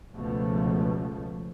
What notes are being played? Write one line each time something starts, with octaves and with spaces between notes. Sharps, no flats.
C#2 B2 F3 A3